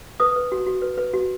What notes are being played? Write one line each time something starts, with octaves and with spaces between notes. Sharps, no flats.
B4 D#6
B4
F#4
F#4
B4
B4
F#4